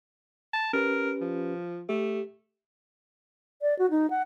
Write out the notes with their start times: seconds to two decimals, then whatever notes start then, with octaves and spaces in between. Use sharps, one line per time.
0.53 A5
0.73 C#4 G4 A#4 B4
1.21 F3
1.89 A3 G4
3.62 D5
3.79 F#4
3.90 D#4
4.10 F#5